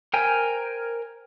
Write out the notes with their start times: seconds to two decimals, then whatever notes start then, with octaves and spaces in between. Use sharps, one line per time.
0.14 A#4 C5 G5 G#5 A#5